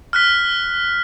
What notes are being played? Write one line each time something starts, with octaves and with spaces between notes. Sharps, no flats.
F6 F#6 B6